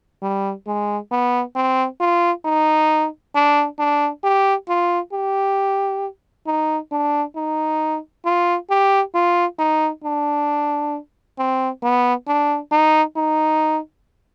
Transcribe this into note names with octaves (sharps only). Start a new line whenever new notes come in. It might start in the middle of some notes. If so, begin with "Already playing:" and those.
G3
G#3
B3
C4
F4
D#4
D4
D4
G4
F4
G4
D#4
D4
D#4
F4
G4
F4
D#4
D4
C4
B3
D4
D#4
D#4